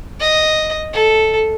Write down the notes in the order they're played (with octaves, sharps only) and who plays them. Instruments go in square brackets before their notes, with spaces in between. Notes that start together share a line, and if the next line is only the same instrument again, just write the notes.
[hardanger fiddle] D#5
A4